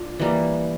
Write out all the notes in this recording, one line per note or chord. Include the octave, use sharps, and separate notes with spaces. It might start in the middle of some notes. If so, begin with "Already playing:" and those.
Already playing: D4 F4
E3 G3 A#3